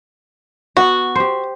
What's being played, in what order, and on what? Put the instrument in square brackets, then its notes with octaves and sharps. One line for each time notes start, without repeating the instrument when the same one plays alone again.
[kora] B3 [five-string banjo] F#4
[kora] G4 C5